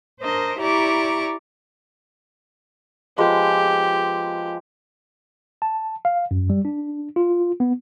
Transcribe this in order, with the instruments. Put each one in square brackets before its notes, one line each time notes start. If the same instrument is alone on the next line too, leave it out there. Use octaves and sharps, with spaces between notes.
[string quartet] D4 A#4 C5 D#5
E4 G4 D5 A#5 C#6 D6
[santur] F3 G#3 B3 [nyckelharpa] G4
[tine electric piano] A5
F5
F#2
G3
D4
F4
B3